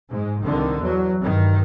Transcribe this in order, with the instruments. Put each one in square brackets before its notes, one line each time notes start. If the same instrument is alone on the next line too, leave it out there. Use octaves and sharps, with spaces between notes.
[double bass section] G#2 G#3
C2 D3 D#3
E2 F#3
G2 D#3